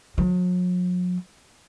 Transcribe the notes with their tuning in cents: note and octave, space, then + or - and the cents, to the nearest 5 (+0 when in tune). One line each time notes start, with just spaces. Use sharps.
F#3 -45